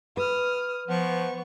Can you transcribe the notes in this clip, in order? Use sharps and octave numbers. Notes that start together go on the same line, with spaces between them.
B4 D#6 F6
F3 B3 C#6